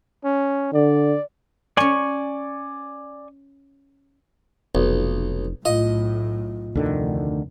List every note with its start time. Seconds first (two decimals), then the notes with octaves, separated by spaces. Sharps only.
0.24 C#4
0.73 D3 D5
1.77 C#4 C#5 D5 G#5 C#6
4.75 F1 B1
5.65 B1 A2 F4 D#5
6.75 F1 D2 D3 D#3